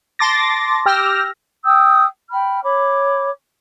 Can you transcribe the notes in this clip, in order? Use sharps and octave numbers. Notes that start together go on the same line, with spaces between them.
A5 C6 D6 A6 A#6
G4 G5 E6 F6 A#6
G5 D#6 E6 G6
G5 B5 F6
C#5 B5 D6